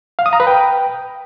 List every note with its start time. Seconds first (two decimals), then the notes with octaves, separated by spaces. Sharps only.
0.19 F5
0.26 D#6
0.33 A#5
0.40 B4
0.47 G5